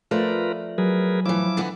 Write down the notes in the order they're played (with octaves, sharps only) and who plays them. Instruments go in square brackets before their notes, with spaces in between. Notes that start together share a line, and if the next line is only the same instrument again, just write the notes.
[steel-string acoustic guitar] F3 A3 D5 [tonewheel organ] F4 A#4 B4
[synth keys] F#3 [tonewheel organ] G#4 A#4 B4
[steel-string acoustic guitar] A2 E3 [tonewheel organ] F3 E4 D6
[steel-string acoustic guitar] D3 E3 B3